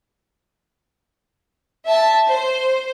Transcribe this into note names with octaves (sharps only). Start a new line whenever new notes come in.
E5 A5
C5